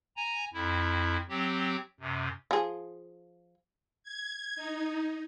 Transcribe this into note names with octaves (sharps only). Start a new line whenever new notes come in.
G#5 A#5
F2 E4
F#3 C4 G4
F#2 C3
F3 G#4
G#6
D#4